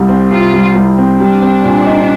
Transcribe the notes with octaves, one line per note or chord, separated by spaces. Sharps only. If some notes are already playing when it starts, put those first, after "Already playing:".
Already playing: C2 C3 G3
C4
C3 F4
G3
C2
C4
G3 D4
C4
A#2
D#4